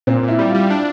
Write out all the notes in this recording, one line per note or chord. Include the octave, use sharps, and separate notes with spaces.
A#2 C4
A#2
E4
G3
G3 F4
D4